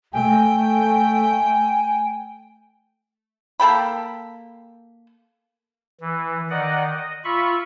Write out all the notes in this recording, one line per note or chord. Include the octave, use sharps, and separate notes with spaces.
A3 G5 G#5
A#3 A4 G5 B5
E3
D#3 D5 D#5 F#5
D#5
F4 E5 B5 C#6